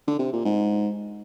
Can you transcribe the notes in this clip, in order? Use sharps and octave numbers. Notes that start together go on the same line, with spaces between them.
D3
C3
A#2
G#2